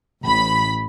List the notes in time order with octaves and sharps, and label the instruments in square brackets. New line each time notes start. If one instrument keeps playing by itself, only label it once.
[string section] A1 B5